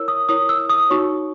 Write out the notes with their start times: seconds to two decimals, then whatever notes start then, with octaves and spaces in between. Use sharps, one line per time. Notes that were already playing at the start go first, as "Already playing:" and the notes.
Already playing: E4 A#4 C#5 E6
0.08 D#6
0.29 E4 A#4 C#5 D#6
0.49 E6
0.70 D#6
0.90 D#4 F#4 C#5 C#6